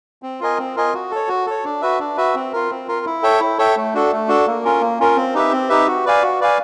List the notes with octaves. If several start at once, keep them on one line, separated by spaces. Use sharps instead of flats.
C4
F4 A#4 D#5 G#5
C4
F4 A#4 D#5 G#5
F#4
A4 C#5
F#4
A4 C#5
D4
F#4 B4 E5
D4
F#4 B4 E5
C4
F4 A#4
C4
F4 A#4
E4
A4 C#5 E5 G5
E4
A4 C#5 E5 G5
A3
D4 F#4 A4
A3
D4 F#4 A4
A#3
C#4 F4 A#4
A#3
C#4 F4 A#4
C4
D#4 G4 B4 E5
C4
D#4 G4 B4 E5
F#4
B4 D5 F5 G#5
F#4
B4 D5 F5 G#5